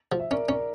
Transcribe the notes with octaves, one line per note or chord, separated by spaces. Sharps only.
F3
E5
C#4 A#4 D5
C#4 A#4 D5